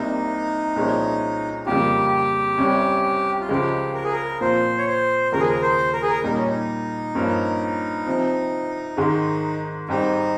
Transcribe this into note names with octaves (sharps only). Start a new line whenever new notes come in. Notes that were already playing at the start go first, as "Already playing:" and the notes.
Already playing: C2 C3 G3 A#3 D#4
C2 A#2 F3 G#3 C#4
F2 C#3 G3 A#3 F4 G4
C2 C3 G3 C#4
F4
C#2 C#3 F3 G#3 G4
A#4
G#4
A#4
A#2 F3 C4 F4 C5
C#5
C5
D#2 C#3 F3 G#3 A#4
G#4
A#4
C5
A#4
G#4
A#4
A#2 G3 A#3 D#4
C#4
D#4
G2 F3 A#3 C#4
C3 F3 C4
G#2 D#3 G#3
G#2 G3 C4 D#4 G4